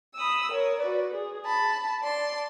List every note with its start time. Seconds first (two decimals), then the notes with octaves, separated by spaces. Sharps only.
0.16 B5 D#6 E6
0.51 A#4 C#5
0.79 F#4 B4 D5
1.13 G#4
1.46 A5 B5
2.02 D5 A5 C6